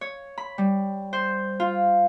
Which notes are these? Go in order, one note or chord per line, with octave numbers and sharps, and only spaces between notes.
C#5
B5
G3
C5
F4